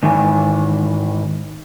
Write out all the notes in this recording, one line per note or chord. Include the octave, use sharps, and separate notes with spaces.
G#2 D#3 E3 G#5